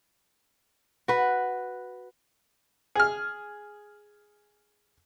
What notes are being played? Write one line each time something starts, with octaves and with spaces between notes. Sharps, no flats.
F#4 B4
G#4 F6